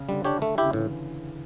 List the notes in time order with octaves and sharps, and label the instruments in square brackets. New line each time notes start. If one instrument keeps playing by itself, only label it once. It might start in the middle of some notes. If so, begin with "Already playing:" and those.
Already playing: [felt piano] C#3
[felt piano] D3 [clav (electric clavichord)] G3
[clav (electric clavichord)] D4 G4 C#5
A3
[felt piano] C#3 [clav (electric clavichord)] E4 G4
[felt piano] D3
[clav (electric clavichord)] A2 [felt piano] E3